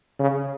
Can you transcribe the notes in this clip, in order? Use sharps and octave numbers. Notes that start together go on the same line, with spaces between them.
C#3